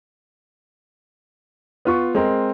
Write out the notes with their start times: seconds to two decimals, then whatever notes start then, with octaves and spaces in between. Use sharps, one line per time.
1.85 B3 F4 C#6
2.15 G#3 C4 A#4